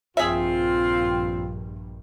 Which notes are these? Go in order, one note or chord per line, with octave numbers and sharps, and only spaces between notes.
A#1 G2 C4 F4 G#4 E5